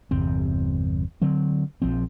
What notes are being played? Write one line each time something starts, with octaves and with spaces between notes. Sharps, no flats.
G1 E2 C3 C4
D3 F#3 C4
A#1 F3 C4